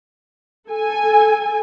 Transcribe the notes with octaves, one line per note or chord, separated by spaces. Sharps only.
A4 G#5